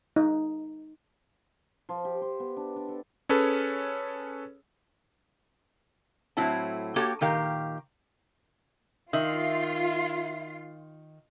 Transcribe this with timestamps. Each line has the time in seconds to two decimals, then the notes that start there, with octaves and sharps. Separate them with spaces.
0.16 D#4
1.89 F3
2.05 G4
2.21 C5
2.40 B3
2.57 D4
2.76 D4
2.89 A4
3.29 C#4 G#4 A4 B4 C#5
6.37 A2 F#3 C4 E4 A5
6.96 A#3 F#4 G4 A4 C#5 G5
7.21 A#2 D#3 G4 A#4 F5
9.13 D#3 F4 E5 C7